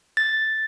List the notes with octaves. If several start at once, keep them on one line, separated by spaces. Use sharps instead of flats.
A6